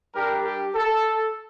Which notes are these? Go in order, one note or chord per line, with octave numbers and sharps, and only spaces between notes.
G3 D4 G4 A#4
G4
A4